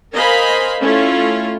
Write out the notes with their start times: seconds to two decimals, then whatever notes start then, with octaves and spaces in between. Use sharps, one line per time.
0.14 A#4 C5 D#5 F5 G#5 B5
0.81 A3 C#4 E4 F4